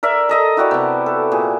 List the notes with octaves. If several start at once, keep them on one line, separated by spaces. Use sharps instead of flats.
A#4 D5 E5
A4 D#5 A#5
E4 F#4 G4 D5
C3 B3
A4
A#2 G#4